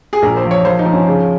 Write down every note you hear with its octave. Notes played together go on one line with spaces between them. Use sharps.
G#4
A#1 A#4
C5
F3
C#5
F3 C5
D#4
F3
C#4
C#3